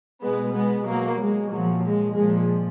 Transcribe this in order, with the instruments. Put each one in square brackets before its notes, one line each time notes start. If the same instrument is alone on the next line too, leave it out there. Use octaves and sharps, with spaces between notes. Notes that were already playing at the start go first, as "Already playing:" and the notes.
[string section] B2 G#3 B3
G#3 B3
B2 F#3 A#3
G#3
A#2 F3 F#3
G#3
A#2 F3 G#3